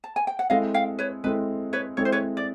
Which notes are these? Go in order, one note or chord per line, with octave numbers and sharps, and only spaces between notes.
A5
G#5
G5
F#5
G#3 C4 E4 A4 D#5 F5
F5 G5
B4 C#5
G#3 C4 E4 A4 B4
B4 C#5
G#3 C4 E4 A4 C#5
C5
B4 C#5
D5